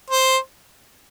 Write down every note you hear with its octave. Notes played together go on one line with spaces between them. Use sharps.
C5